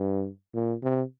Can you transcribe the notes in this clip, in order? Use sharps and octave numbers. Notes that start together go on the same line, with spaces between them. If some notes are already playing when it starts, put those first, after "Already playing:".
Already playing: G2
A#2
C3